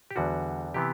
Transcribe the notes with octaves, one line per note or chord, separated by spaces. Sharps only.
G4
E2 D3 G3 F#4
C3 E3 B3 G4